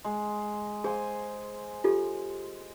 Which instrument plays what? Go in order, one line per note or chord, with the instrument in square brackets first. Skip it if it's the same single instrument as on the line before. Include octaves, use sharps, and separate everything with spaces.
[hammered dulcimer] G#3
[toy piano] G#4 [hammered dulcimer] C5 G#5
[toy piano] F4 G4 A4